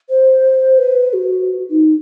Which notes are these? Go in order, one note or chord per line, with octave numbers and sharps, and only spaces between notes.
C5
B4
F#4
D#4